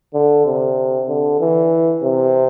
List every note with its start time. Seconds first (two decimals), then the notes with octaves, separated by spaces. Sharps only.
0.14 D3
0.46 C3
1.08 D3
1.40 E3
2.03 C3